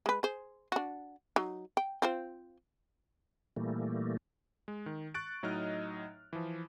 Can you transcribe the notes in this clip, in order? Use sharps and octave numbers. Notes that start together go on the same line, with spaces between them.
G#3 B4
G#4 C5
D4 F#4
F#3 D#4
G5
C4 F4 C5
A#2 E3 G3 A3 A#3
G#3
D#3
C#6 F#6 A6 D7
A2 F#3 D#4 D#5 F6
E3 F3